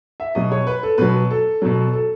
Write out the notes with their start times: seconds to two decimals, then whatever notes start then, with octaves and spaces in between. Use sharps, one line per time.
0.20 E5
0.35 B2 F#3 D#5
0.52 C#5
0.67 B4
0.83 A4
0.98 B2 F#3 B4
1.31 A4
1.62 B2 F#3
1.93 A4